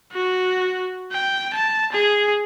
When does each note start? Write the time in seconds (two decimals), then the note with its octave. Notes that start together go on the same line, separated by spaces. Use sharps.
0.13 F#4
1.12 G5
1.54 A5
1.92 G#4